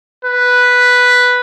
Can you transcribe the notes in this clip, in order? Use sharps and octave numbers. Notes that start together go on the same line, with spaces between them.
B4